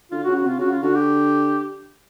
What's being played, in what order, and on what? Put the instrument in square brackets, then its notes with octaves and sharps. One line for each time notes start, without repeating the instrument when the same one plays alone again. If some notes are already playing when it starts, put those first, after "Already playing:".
[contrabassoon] D3 [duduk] F4
[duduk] F#4
[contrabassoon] C#3
[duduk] F#4
[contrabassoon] C3 [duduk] F4
[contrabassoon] C#3 [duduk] F#4
[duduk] F4
[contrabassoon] D3 [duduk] F#4
[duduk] G4